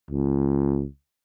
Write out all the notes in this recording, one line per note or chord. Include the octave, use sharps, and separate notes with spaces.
C#2